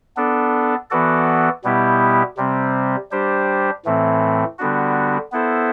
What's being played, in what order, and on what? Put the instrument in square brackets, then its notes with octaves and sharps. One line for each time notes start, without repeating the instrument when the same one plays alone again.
[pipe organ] B3 D4 A4 D5
E3 B3 F#4 A4 D5
B2 G3 B3 E4 G4
C3 G3 C4
G3 D4 G4 C5
A2 E3 A3 C4
D3 G3 B3 D4 F#4
B3 E4 A4 C5